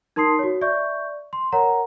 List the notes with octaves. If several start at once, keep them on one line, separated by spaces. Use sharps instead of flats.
D#4 A#4 A5 C6 D#6 C7
F#4 C#5
D5 E5 C#6 G6
C6
A#4 C#5 F#5 A#5